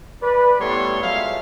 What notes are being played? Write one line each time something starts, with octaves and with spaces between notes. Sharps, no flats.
B4 D5
A2 G3 B3 A4 C#5 C6
F3 F#3 G#3 E5 F5